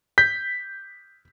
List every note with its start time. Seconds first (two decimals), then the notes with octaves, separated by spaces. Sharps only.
0.18 G6 B6